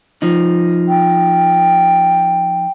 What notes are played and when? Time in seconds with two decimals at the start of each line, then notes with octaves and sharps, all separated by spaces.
0.22 F3 D#4
0.89 G5